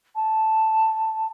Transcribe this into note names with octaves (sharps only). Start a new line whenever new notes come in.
A5